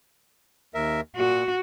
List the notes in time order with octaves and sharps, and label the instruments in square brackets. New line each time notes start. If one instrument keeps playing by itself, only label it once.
[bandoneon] D#2 A#4 E5
[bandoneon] A#2 [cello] F#4